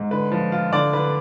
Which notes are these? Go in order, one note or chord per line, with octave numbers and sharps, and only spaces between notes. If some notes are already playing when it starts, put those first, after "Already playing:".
Already playing: G#2
D3 B4
F3
F4
D3 D5
D3 B4